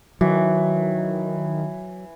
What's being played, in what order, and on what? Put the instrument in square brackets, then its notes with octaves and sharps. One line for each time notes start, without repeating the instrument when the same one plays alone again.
[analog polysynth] D#3 [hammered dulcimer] E3 [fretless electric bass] F#3